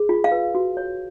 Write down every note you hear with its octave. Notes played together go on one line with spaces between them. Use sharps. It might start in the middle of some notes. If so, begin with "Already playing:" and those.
Already playing: G#4
F4
F5
B4
F#4
C#5